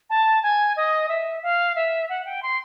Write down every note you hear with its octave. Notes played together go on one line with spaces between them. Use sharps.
A5
G#5
D#5
E5
F5
E5
F#5
G5
C6